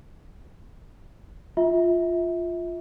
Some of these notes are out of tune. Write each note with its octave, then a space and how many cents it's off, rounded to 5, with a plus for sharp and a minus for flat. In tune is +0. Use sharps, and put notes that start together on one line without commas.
F4 +0 E5 -25